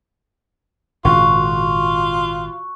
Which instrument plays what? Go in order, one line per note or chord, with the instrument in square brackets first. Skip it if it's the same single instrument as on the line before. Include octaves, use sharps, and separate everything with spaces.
[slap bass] G#1 A#2 C#3 [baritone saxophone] F4 [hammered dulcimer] F#4